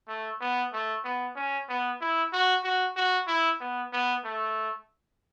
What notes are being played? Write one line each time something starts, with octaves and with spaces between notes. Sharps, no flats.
A3
B3
A3
B3
C#4
B3
E4
F#4
F#4
F#4
E4
B3
B3
A3